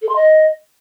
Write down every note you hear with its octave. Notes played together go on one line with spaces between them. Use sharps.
A4
C6
D#5